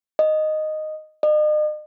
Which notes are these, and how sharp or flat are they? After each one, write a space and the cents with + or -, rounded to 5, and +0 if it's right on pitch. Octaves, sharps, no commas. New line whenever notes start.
D#5 -5
D#5 -45